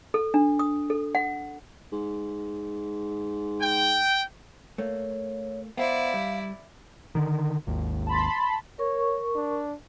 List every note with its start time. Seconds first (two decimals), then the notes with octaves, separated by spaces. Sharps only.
0.14 A4
0.34 D4
0.59 D#6
0.90 A4
1.15 F#5
1.92 G#2
3.61 G5
4.78 A3 A#3 C#5
5.77 B3 E4 C5 D5 F5
6.14 G3
7.15 D3 D#3
7.67 G#1 D#2
8.07 A5 B5 C6
8.79 A#4 C#5 C#6
9.35 D4